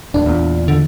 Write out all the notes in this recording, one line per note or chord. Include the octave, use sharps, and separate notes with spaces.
D1 D4
E2 A#2
D3